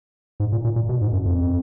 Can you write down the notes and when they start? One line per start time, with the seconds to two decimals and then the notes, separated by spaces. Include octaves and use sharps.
0.40 G#2
0.52 A#2
0.64 A#2
0.76 A#2
0.89 B2
1.01 G#2
1.13 F#2
1.25 F2